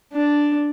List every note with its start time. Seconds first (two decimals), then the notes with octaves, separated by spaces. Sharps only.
0.13 D4